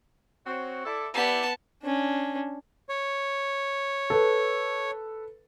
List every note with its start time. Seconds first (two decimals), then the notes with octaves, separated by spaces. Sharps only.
0.46 C4 F#4 C#5
0.84 E4 A4 D5
1.14 B3 E4 G4 D5 A5
1.83 C#4 D4
2.89 C#5
4.10 A4 B4